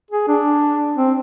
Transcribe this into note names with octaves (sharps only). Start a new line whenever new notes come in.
G#4
D4
C4